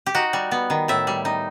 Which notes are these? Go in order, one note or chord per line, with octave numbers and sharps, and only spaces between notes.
G4
D#4 F#4
G3
B3
D#3
A2 E5
G3
D#4